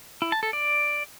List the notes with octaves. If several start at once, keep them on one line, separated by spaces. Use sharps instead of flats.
E4
A5
A4
D5